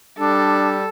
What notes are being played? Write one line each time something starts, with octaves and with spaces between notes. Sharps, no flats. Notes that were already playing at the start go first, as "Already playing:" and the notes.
G3 D4 A4